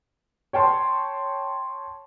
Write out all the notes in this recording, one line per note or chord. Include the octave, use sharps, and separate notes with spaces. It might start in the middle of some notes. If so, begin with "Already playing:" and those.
C#5 G5 A5 C6